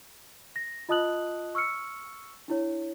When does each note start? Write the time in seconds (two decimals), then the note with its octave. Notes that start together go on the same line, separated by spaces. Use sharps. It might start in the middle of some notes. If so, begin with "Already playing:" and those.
0.56 A#6
0.89 F4 D#5 A5 D#6 F#6 F#7
1.55 C#6 E6 F6 C#7
2.48 D4 E4 C#5